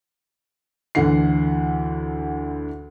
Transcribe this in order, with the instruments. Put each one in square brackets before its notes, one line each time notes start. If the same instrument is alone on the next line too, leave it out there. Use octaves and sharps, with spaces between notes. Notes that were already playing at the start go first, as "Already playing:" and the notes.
[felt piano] D2 D3 E3 F#5 C7